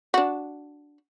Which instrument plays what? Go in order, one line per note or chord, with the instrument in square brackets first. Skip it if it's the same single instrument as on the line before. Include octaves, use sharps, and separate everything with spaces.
[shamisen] D4 F#4